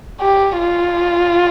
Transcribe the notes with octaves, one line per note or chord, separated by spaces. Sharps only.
G4
F4